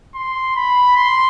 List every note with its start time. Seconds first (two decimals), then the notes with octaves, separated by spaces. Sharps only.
0.15 C6
0.56 B5
0.96 C6